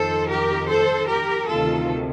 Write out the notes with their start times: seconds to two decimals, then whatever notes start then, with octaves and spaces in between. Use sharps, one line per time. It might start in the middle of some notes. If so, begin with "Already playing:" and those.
Already playing: F2 D#3 A4 C5
0.28 G4 A#4
0.68 A4 C5
1.08 G4 A#4
1.48 D2 C3 D#3 F4 A4